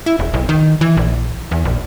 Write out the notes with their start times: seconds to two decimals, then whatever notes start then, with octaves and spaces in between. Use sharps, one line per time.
0.06 E4
0.19 E1
0.34 B1
0.49 D#3
0.81 E3
0.97 A#1
1.51 E2
1.65 A#1